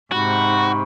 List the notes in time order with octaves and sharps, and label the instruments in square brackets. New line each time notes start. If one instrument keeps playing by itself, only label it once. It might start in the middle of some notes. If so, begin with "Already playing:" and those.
[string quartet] G#2 C3 [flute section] D#4 B5 C#6 [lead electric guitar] F#4